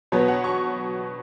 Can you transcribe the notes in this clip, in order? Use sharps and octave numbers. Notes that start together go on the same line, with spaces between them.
B2 F#3 B3 C#5
F#5
C#6